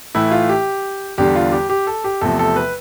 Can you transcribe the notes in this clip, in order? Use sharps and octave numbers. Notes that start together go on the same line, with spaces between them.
A2 E3 A3 E4
F4
G4
E2 D3 G3 G4
F4
G4
G4
A4
G4
E2 C3 F3 A3 A4
A4
B4